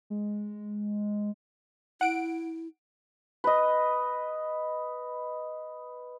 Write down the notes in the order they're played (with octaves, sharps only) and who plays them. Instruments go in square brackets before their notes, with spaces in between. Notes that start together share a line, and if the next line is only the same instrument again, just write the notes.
[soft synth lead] G#3
[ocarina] E4 [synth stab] F#5 D7
[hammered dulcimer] B4 D#5